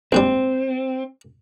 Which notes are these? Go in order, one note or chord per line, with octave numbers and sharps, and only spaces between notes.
A#1 G#2 G3 C4